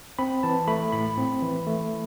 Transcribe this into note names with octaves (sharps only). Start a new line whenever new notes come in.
C4 B5
E3 A5
A3 B5
A2 B5
C4
E3
A3